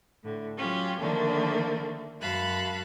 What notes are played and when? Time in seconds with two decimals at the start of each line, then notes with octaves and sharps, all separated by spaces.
0.23 A2 D3
0.58 F#3 C#4 F4 G4
0.99 D3 D#3 F3 A3 A#3 D4
2.21 F#2 F#4 F5 A5 B5 F#6